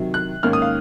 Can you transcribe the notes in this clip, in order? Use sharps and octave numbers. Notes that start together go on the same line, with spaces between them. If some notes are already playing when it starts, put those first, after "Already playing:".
Already playing: C3 D#3 F#3
F#6
G#2 D#3 A#3 C#4 F6
D#6
F5